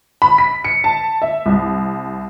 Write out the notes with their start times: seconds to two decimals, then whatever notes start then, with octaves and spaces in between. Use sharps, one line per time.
0.22 B5
0.38 B6
0.64 C#7
0.84 A5
1.22 E5
1.46 C2